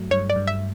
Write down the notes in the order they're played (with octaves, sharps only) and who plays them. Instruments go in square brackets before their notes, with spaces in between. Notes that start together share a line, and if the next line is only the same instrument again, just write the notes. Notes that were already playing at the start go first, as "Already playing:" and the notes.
Already playing: [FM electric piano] G2 F#3 A3
[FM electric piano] G2 [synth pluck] C#5
[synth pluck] D5
[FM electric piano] G2
[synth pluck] E5